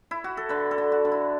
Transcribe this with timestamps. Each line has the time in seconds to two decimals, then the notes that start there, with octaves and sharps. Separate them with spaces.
0.11 E4
0.24 F#4
0.37 A4
0.49 D3 B4
0.71 A4
0.78 D3
0.92 F#4
1.05 D3
1.12 E4